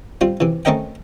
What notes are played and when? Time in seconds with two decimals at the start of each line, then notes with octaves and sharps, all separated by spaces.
0.21 G3 C4 F4
0.40 C3 E3
0.65 A3 C4 C#4 A#4 D#5 G5